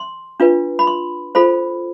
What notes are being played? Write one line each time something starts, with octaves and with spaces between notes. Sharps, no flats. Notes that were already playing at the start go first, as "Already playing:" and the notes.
Already playing: C6
D4 F4 B4
B5
C6
F4 A4 C5 B5